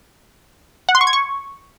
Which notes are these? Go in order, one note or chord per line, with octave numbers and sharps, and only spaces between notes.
F#5
C6
C#6
G#6
C#6